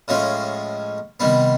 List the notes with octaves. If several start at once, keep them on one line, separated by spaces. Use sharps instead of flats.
A2 F3 G#3 C#4
C3 D#3 G3 B3